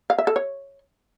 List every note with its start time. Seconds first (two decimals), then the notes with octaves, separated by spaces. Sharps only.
0.10 F5
0.18 E5
0.27 A4
0.36 C#5